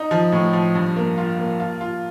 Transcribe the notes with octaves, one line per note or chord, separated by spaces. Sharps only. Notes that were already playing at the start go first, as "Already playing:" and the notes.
Already playing: D#4
F3
A2
F3
G2
A#3
F4
A#3
F4
F4